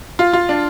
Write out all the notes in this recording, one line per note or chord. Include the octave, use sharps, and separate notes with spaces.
F4
F4
D4